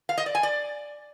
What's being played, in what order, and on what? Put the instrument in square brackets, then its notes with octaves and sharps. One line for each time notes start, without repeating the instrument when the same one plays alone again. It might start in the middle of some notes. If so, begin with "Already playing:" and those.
[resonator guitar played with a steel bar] F5
D#5
D5
G#5
D5